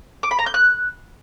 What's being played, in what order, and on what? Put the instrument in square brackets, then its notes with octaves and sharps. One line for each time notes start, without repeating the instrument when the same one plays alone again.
[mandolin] D6
B5
A#5
G6
F#6